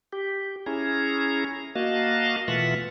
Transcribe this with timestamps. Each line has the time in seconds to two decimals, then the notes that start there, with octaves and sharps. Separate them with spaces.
0.13 G4
0.66 C#4 E4 G#4 A#5
1.75 A#3 F#4 D#5 F5 A5
2.48 B2 E3 A3 F4 E5 F#5